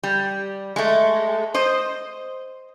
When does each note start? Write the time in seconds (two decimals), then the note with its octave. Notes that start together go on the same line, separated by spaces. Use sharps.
0.03 G3
0.76 G#3 A3
1.54 C5 D#5